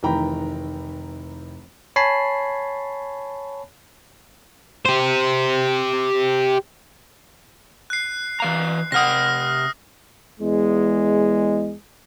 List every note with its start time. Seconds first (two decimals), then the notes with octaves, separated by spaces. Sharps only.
0.03 F1 D#3 E3 G5 A#5 B5
1.96 C#5 G#5 A5 B5 C7
4.86 G4 C5
7.90 F#6 C7
8.40 E3 F5 A#5
8.92 C3 F#5 D#6 F6 A#6
10.40 E2 G#3